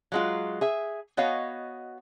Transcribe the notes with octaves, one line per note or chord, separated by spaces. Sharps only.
F#3 G#3 F4
G#4 E5
B3 F#4 C#5 D#5 F5